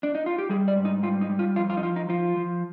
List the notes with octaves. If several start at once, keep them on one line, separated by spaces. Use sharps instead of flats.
D4
D#4
F4
G4
G3 G#4
D5
G#2
D#4
G3 F4
D#4
G3
F4
F2 F4
F4
D#4
F3 F4
D#4
F3 F4
F3